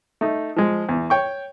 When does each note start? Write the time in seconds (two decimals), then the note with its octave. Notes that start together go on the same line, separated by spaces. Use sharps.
0.21 A3 D#4
0.56 F3 G#3
0.89 E2
1.10 C#5 G5 C#6